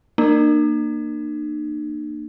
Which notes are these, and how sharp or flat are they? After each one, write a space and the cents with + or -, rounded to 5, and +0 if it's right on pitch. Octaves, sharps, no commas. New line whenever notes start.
A#3 -5 D4 +45